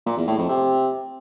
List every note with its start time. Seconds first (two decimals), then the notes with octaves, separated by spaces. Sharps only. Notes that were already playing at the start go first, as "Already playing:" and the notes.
0.06 A#2
0.17 E2
0.28 A2
0.38 F2
0.49 C3